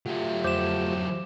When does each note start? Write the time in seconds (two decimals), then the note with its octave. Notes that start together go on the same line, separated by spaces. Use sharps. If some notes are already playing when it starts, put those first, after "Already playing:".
0.06 F#3 A3 E4 F4 G4
0.44 F2 C5 D6 G6 E7